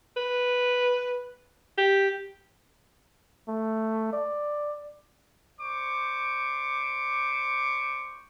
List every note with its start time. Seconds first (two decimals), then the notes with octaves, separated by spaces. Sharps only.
0.17 B4
1.78 G4
3.48 A3
4.13 D5
5.60 C5 D5 C#6 D6